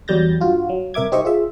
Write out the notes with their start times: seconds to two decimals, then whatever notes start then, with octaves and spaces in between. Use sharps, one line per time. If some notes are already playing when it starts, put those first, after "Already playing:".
0.08 E2 F#3 G3 G6 A6 A#6
0.40 G2 F4 F#4
0.69 F#3
0.94 C2 A#4 E5 D6 G#6
1.12 D#4 G4 C5 D#5 E5 C#6
1.25 F4 G#4 E5